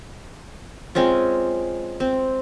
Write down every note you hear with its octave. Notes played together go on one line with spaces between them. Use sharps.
G#3 C4 C#4 F4
C4